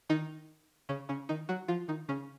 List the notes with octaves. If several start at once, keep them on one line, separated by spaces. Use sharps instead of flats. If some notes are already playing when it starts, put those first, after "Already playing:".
D#3 D#4
C#3 C#4
C#3 C#4
D#3 D#4
F#3 F#4
F3 F4
D#3 D#4
C#3 C#4